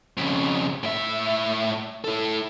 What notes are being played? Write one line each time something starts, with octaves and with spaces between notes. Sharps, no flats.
F2 C#3
A2 E5
E4 A4